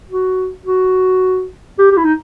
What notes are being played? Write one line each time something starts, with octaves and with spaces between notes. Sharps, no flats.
F#4
F#4
G4
G4
E4
D#4